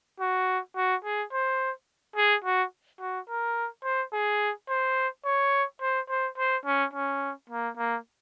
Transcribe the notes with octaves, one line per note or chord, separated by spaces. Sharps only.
F#4
F#4
G#4
C5
G#4
F#4
F#4
A#4
C5
G#4
C5
C#5
C5
C5
C5
C#4
C#4
A#3
A#3